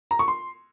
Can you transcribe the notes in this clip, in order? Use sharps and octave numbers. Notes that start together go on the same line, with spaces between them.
A#5
C#6
C6